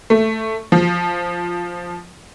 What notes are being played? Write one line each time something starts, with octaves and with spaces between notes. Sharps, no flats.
A3
F3